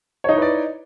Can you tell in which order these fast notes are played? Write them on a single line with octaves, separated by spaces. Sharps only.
C#5 D#4 E4 B4 D5